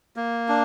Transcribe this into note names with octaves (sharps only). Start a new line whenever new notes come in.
A#3
D4